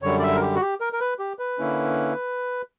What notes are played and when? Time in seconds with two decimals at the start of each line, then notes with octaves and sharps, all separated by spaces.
0.02 F#2 D3 G3 C#5
0.19 D5
0.23 E5
0.35 A#4
0.42 G4
0.55 F#4
0.61 G4
0.81 A#4
0.93 A#4
1.00 B4
1.19 G4
1.39 B4
1.59 D3 A#3 C#4 E4